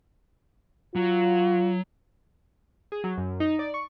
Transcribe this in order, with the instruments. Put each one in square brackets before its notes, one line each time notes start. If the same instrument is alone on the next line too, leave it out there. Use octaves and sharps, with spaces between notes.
[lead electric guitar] F#3 [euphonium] F4
[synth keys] G#4
F#3
F#2
D#4
D5
C#6